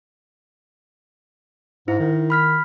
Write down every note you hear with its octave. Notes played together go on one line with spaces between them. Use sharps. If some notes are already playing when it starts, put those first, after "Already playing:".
G#2 D#4 E4
D#3
B5 F6 B6